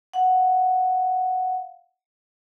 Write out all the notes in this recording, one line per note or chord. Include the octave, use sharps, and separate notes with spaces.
F5 F#5